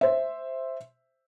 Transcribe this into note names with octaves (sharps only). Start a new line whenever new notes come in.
C5 E5